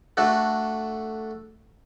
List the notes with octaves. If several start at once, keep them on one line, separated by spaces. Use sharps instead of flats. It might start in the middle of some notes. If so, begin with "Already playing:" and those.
A3 D4 F#4 A4